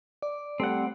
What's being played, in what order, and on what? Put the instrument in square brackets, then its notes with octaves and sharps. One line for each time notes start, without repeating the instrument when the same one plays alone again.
[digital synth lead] D5
[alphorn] G3 [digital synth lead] A3 [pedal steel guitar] C4 F#5